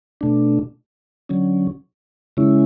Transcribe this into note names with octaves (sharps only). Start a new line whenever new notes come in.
B2 A3 D4
D3 F#3 C#4
C#3 G#3 C#4 E4